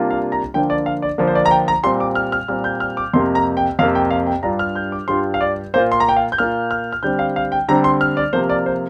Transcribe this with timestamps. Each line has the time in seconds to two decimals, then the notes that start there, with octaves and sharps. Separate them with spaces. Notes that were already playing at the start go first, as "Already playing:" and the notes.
Already playing: C3 G3 A#3 D4 F4
0.11 F5
0.32 A#5
0.54 D3 F3 A#3 D4 G5
0.70 D5
0.86 F5
1.02 D5
1.18 D3 F3 A#3 D4
1.27 C5
1.35 D5
1.46 A#5
1.51 G5
1.68 A#5
1.83 A#2 G3 C4 C6
2.00 D6
2.15 F6
2.32 F6
2.48 A#2 G3 C4 F6
2.64 G6
2.80 F6
2.97 D6
3.14 F2 C3 A#3 C6
3.35 A#5
3.57 G5
3.79 F2 C3 A#3 F5
3.95 G5
4.11 F5
4.27 G5
4.43 G2 G3 D4 F4 A#5
4.59 F6
4.76 G6
4.92 D6
5.08 G2 G3 D4 F4 C6
5.34 F5
5.41 D5
5.74 A#2 A#3 F4 C5
5.92 C6
6.00 A#5
6.09 G5
6.16 F5
6.32 G6
6.38 A#2 A#3 F4 F6
6.71 F6
6.93 F6
7.03 D3 G3 C4 G6
7.19 F5
7.36 F5
7.52 G5
7.68 D3 G3 C4 A#5
7.84 C6
8.01 F6
8.17 D5
8.33 C3 F3 A#3 C5
8.49 D5
8.66 C5